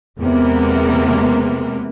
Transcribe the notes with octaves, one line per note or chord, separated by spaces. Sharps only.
E2 C3 G#3 A#3 B3